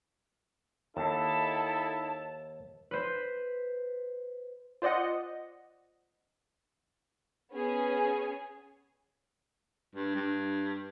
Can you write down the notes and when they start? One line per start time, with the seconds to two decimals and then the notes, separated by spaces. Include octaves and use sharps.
0.97 D#2 D#4 E4 A4 A5
2.91 B4 C5
4.82 F4 C5 D5 D#5 F#5
7.52 B3 C#4 G#4 G#5
9.95 G2
10.15 G2